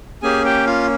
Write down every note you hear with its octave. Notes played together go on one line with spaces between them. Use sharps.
A#3 C#4 G4 G#4 G#5
G4 G5
F4 F5